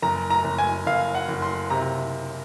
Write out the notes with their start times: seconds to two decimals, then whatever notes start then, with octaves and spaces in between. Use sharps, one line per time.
0.02 F#1 A#5
0.30 A#5
0.44 F#1
0.58 G#5
0.86 F#1 F5
1.15 F#5
1.28 F#1
1.42 C6
1.70 C3 A#5